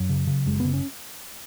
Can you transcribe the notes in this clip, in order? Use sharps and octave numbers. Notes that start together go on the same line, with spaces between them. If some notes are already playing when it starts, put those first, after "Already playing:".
Already playing: F#2 F#3
C#3
C#3
F#1 G#3
C#3 B3
C#4